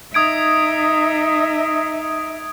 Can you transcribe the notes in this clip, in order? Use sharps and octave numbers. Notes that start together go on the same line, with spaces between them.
D#4 E5 D#6 G#6 D7